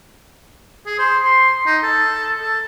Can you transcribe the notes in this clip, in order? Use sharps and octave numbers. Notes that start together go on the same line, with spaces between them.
G#4
C5
C6
D#4
A4
A4